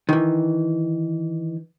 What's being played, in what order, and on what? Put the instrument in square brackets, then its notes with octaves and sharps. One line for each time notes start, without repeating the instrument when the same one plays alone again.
[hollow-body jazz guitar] D#3 E3